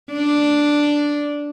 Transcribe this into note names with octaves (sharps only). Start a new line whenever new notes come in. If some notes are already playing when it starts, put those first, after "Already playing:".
D4